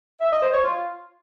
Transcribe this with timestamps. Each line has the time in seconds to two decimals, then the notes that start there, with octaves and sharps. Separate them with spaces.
0.21 E5
0.31 D#5
0.42 C5
0.52 C#5
0.63 F4